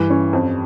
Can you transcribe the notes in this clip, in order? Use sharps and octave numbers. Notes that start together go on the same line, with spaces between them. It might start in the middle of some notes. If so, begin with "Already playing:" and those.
Already playing: G2 E3
C#4
F2